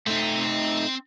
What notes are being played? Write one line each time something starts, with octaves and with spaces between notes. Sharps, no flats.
A3 C4 D#4 G5